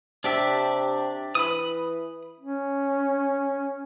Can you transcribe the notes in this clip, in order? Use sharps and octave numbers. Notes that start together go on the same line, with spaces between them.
C3 D4 G4 E5
E3 B5 D#6
C#4